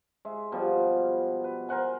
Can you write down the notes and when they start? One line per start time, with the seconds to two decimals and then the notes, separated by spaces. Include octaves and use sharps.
0.25 G#3 E5
0.52 B2 F3 G3
1.44 B4
1.69 A#4 C5 F#5 G#5